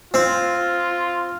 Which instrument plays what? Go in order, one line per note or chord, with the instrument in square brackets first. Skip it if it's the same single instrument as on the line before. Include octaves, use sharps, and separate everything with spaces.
[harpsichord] C4 [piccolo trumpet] F4